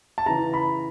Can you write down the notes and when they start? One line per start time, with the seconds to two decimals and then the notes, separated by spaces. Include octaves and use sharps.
0.18 A5
0.26 C#3 E3 A#5
0.54 B5